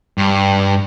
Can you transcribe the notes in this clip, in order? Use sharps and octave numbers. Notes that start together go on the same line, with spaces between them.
G2